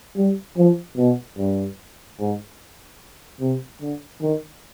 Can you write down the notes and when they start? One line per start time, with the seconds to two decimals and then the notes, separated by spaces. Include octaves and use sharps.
0.16 G3
0.57 F3
0.97 B2
1.38 G2
2.20 G#2
3.40 C3
3.81 D3
4.21 D#3